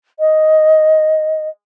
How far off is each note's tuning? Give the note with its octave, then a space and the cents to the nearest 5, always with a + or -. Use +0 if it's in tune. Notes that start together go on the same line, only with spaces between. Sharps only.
D#5 +5